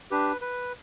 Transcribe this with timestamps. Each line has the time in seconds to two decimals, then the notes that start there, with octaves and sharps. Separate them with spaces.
0.11 D4 G4 B4
0.41 B4